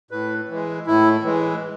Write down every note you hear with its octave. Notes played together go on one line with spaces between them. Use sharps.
A2 B4
E3 G#3
A2 E4
E3 G#3